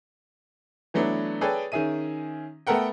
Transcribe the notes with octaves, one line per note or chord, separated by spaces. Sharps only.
E3 F#3 A3 B3 D4
G#4 A4 B4 C#5 D5 G5
D#3 C#4 G#4 E5 D#7
A3 B3 A4 A#4 F#5 G5